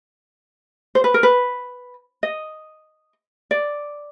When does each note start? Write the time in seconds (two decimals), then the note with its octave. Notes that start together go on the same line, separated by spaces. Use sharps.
0.95 C5
1.04 B4
1.14 A#4
1.23 B4
2.23 D#5
3.51 D5